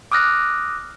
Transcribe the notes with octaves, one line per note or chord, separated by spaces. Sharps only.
D6 D#6 F6 F#6 A#6